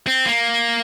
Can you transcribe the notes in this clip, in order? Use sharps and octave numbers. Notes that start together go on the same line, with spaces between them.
C4
A#3